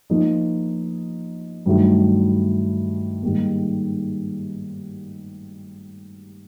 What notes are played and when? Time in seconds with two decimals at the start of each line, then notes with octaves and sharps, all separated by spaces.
0.10 F3 A#3 D#4
1.66 G2 D#3 F#3 A3
3.23 G#2 D#3 G3 A#3